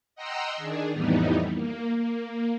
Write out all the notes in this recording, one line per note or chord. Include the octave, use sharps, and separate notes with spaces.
D#5 F#5 G5 A#5 C6 E6
D#3 D4 G#4
F2 A2 E3 G3 B3 D#4
A#3
A#3